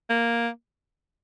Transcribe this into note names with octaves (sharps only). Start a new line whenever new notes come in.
A#3